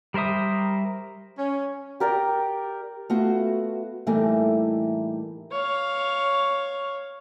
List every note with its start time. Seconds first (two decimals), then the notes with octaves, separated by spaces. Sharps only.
0.14 G3 A#4 C5 E5 D#6
1.37 C#4
2.00 G4 A#4 D5 G5
3.10 A3 B3 F4 F#4
4.07 A2 E3 G3 A3 A#3 D#4
5.51 C#5 F5